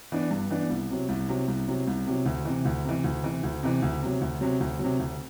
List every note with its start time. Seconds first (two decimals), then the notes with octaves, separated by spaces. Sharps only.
0.12 E3 B3 D4
0.31 G2
0.51 E3 B3 D4
0.70 C2
0.90 C3 F#3
1.09 C2
1.29 C3 F#3
1.48 C2
1.68 C3 F#3
1.87 C2
2.07 C3 F#3
2.26 D2
2.45 C3 E3
2.65 D2
2.84 C3 E3
3.04 D2
3.23 C3 E3
3.43 D2
3.63 C3 E3
3.82 D2
4.02 C3 F#3
4.21 D2
4.41 C3 F#3
4.60 D2
4.79 F#3
4.84 C3
4.99 D2